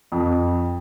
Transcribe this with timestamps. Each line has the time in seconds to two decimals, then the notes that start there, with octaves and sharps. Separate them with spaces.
0.12 F2